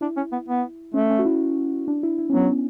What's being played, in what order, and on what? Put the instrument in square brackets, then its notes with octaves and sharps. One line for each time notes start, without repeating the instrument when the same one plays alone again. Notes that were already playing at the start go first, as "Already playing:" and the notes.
[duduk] D4 [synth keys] E4
[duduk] C#4
B3
B3
[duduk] A3 [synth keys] C#4
[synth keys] C#4
F#4
E4
D4
E4
E4
C#4
[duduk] F#3 [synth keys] B3